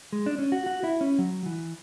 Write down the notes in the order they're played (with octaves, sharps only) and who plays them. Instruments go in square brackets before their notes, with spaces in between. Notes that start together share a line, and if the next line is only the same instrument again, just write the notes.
[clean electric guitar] G#3
D4
C#4
F#4
F#4
E4
C#4
F#3
E3